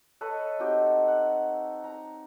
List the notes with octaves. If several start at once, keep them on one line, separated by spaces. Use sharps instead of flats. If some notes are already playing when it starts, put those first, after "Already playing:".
A4 B4 C#5 D#5
C4 D#4 F#4 G4
F#5
A#5